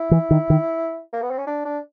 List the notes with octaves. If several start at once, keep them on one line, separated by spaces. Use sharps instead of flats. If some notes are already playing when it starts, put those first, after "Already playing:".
Already playing: E4
E3
D#3
D#3
A#3
B3
C4
C#4
D4
D4